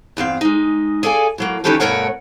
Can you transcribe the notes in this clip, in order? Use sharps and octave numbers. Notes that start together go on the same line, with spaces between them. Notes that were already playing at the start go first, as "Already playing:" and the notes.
E2 G2 C4 F5
G#3 D#4
G#4 A4 D5 F5 G5 G#5
A2 F#3 A#3
D#3 E3 C#4 G4 A4 B4
G2 B2 A3 A#4 C#5 F#5